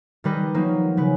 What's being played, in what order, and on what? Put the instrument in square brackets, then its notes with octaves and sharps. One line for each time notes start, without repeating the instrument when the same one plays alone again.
[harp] D#3 G3 B4 D#5
F3 F#3 A#3 D#4
C#3 B4